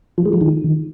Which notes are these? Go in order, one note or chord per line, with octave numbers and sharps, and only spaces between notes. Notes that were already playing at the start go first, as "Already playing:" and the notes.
F3
G#3
F3
D#3